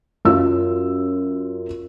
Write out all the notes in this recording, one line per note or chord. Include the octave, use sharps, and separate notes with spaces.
F#2 F4 E6